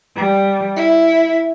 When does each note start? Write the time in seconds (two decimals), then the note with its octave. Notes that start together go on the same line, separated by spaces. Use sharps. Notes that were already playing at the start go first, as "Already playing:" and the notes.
0.15 G3
0.77 E4